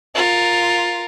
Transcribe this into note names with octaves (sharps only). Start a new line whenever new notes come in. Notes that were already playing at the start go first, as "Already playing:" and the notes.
F4 A#4